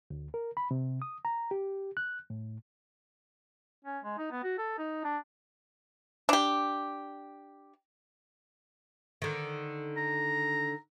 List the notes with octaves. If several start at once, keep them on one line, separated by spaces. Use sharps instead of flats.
D2
A#4
B5
C3
D#6
A#5
G4
F#6
A2
C#4
G#3
D#4
B3
F#4
A4
D#4
D4
D4 G4
D3 D#3
A#5